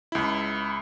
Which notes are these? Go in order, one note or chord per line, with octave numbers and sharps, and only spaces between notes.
C#2 E4